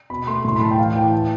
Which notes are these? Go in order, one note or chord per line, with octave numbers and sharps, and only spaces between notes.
B2 B5
A3 C6
A2 C6
B5
A2 A5
G5
E3 F5
E3 G5
A5